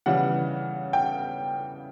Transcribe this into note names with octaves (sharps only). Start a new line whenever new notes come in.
C#3 E3 G3 F#5
G5